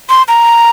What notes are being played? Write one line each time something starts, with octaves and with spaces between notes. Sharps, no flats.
C6
A#5